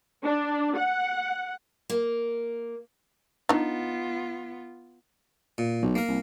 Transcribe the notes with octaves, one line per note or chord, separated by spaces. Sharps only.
D4
F#5
A#3
B3 D4 D#4 F4
A#2
B1
A#3 A#4
C2